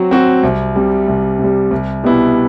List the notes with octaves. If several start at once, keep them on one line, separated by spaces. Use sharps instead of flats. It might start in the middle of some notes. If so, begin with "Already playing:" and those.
Already playing: F#3 C4 F#4
C4 F#4
C2
C3 G3
C2
C3 G3
C2
B2 G3 B3 E4